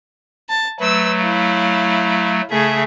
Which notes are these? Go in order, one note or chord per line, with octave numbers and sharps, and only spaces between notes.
A5
F#3 A3 B4 E6
E4 F5
C#3 A3 G#4 E5